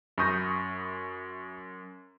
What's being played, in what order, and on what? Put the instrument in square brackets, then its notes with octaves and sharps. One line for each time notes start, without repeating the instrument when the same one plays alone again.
[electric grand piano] F#2 D#6 A#6 [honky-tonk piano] B5 C#6 G6